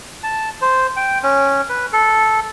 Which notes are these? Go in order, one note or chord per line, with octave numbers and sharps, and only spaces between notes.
A5
C5
G5
C#4
B4
A4